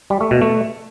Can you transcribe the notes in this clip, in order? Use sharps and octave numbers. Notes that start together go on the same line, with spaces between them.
G3
A3
B2
A3